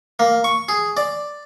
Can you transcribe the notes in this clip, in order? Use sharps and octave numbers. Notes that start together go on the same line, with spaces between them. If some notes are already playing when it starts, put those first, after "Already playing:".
A#3
C#6
G#4
D5